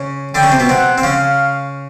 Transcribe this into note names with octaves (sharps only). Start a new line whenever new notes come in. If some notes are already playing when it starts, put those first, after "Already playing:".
Already playing: C#3 C#4
D3 D4 G5
C#3 C#4
C3 C4
B2 B3
C3 C4 F#5
C4
C#3 C#4 F5